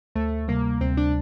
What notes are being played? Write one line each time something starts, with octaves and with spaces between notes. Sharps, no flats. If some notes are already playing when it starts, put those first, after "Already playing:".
D2 A3
C3 G3 A#3
D2 C4
D4